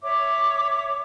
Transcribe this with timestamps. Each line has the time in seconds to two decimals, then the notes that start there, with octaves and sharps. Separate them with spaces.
0.01 C#5 E5 D6